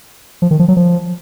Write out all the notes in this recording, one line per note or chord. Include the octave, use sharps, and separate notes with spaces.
F3
D#3
F3
F#3
F3